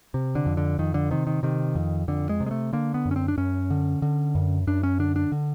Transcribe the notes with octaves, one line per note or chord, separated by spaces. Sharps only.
C3
D3
F2
D3
F2 D#3
D3
C3 D#3
D#3
C3 D#3
F2
F2 D3
G#3
C3
G#3
A3
D3 A#3
B3
F#2
C#4
C4
D4
F#2 C#4
D3
D3
F#2
F#2 D4
C#4
D3 D4
D4
D3